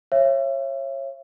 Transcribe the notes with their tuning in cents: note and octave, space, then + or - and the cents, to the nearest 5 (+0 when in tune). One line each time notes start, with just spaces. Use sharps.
C#5 -25 E5 +35